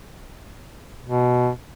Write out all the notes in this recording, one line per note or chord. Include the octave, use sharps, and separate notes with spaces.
B2